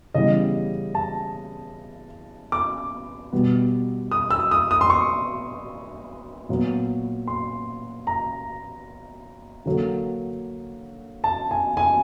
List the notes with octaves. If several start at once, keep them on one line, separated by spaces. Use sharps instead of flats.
C#3 E3 G3 B3 D#5
A5
D6
B2 G3 B3
D#6
E6
D#6
D#6
C6
C#6
A#2 F#3 B3
C6
A#5
D3 F#3 A#3
A5
G#5
G#5